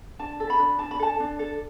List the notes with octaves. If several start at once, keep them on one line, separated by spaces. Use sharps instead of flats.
D4 A5
A4
B5
D4
D4 A5
B5
A4 A5
D4
A4